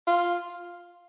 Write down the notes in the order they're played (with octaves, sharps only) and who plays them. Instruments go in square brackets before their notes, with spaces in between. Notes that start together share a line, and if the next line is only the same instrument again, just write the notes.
[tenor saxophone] F4